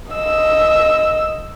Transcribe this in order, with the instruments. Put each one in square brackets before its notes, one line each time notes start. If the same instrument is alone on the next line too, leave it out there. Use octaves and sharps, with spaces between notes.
[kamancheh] D#5 E6